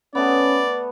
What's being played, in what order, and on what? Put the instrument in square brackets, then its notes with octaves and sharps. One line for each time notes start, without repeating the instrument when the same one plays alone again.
[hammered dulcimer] A3 B3 [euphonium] C#4 [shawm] D5